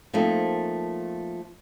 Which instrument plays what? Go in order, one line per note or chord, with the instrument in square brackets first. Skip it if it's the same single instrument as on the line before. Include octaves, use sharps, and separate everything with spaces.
[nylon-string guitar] F3 A3 A#3 C4 D#4